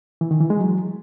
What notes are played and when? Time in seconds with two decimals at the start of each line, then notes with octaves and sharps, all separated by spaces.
0.21 E3
0.31 D#3
0.40 E3
0.50 G#3
0.60 F#3